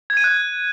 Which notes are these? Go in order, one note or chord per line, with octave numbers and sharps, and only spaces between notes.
G#6
D#7
F#6